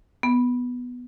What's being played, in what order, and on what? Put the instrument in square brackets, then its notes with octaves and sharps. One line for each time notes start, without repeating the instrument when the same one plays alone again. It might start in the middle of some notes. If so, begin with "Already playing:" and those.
[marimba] B3